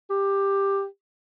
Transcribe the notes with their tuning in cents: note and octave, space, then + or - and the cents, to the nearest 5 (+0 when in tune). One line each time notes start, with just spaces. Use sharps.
G4 +10